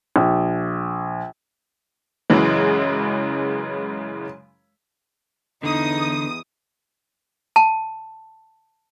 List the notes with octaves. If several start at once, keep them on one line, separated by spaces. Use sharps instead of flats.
A#1
F#2 C#3 E3 G#3
E2 D3 D#4 D#6
A5